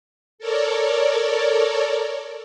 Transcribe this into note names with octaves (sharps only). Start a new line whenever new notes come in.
A4 A#4 C#5 D5